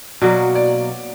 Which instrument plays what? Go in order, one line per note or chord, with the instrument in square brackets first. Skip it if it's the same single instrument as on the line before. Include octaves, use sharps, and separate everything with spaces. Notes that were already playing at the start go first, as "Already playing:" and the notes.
[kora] B2 F#3 A#3 [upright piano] D5
[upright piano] D5